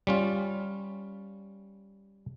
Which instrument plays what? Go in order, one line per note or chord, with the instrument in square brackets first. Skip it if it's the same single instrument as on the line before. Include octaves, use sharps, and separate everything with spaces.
[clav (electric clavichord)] G3 C#4 F4